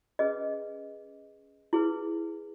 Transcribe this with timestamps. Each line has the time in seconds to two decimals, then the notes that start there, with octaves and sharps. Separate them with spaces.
0.19 C#4 G#4 B4 D#5
1.73 E4 G#4 B4